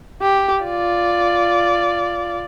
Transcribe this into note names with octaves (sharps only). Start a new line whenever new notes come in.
G4
F4 D5